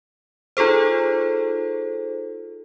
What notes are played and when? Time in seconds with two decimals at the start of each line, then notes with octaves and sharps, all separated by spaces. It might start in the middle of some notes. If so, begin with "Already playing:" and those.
0.57 D#4 F4 G#4 A4 C5